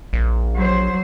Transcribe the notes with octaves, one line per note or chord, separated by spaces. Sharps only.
A#1
F#3 C5